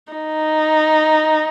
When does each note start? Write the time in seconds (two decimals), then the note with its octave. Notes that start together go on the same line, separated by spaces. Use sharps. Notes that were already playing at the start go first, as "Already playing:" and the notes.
0.13 D#4